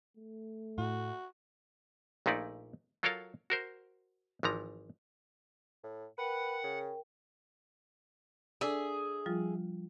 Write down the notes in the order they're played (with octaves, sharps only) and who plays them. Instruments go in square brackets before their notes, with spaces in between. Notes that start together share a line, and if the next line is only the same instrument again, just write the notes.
[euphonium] A3
[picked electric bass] A2 [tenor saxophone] F#4
[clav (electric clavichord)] A#1 A#2 A3 D#4 E4 D5
F#3 F4 A4 A#4 C#5 F5
F#4 A#4 C5
G#1 E3 F3 A#5
[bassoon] A2
[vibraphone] A#4 G5 [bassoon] B4 [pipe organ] F#5
[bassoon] C#3
[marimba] D4 A4 D5 [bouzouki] G#4 E5
[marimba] F3 G3 F4